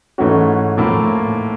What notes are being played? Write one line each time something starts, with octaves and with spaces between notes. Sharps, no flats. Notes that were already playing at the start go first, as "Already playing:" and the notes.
G#2 E3 A3 C#4 F#4
A2 F3 A#3